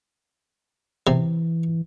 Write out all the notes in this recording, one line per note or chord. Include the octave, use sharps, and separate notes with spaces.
C3 E3